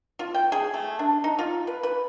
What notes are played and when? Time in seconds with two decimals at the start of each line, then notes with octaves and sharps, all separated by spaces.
0.19 F4
0.34 G5
0.52 G#4
0.74 A3
0.99 D4
1.24 D#4
1.39 F4
1.67 B4
1.83 B4